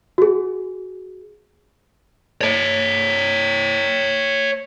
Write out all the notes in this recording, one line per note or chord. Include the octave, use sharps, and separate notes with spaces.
F#4 G#4
C#5 A5